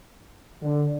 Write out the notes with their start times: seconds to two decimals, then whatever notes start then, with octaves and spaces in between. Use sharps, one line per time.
0.61 D3